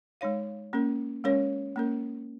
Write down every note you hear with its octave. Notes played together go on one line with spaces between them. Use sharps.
G#3 D#4 C#5 F5
A#3 C#4 A#4
G#3 C#4 A#4 C#5
A#3 C#4 A#4